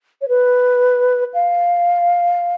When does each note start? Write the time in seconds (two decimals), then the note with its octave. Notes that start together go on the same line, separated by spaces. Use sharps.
0.21 C#5
0.28 B4
1.34 F5